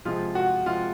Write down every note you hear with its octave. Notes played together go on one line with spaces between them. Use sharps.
C3 F3 G#3 F4
F#4
C3 F3 G#3 F4